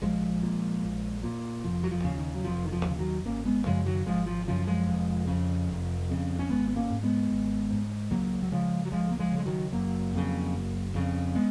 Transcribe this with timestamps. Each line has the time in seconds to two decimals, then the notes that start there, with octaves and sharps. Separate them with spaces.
0.02 A#1 F3 G#3
0.42 A#2
0.83 A#1
1.23 A#2
1.64 F1 F3
1.84 F#3
1.91 F3
2.04 D#2 C#3
2.18 D#3
2.34 F#3
2.44 F1 F3
2.65 D#3
2.72 F3
2.85 D#2 C#3
2.99 D#3 F#3
3.25 G#1 A#3 C#4
3.45 G#3 B3
3.66 F#2 C#3 F3 G#3
3.86 D#3 F#3
4.06 G#1 F3 G#3
4.26 F3
4.48 F#2 C#3 F3
4.67 F3 G#3
4.87 F1
5.27 F2 C#3
5.69 F1
6.09 F2 C#3
6.39 C#4
6.49 G#1 G#3 B3
6.68 B3
6.76 A#3 C#4
6.90 G#2
7.03 G#3 B3
7.30 G#1
7.71 G#2
8.11 C#2 F#3 A#3
8.42 F#3
8.51 C#3 F3 G#3
8.85 F#3
8.92 C#2 F3 G#3
9.11 A#3
9.19 F3 G#3
9.32 C#3
9.38 G#3
9.45 D#3 F#3
9.72 F#1 F#3 A#3
10.13 F2 C#3
10.54 F#1
10.94 F2 C#3
11.35 G#3 B3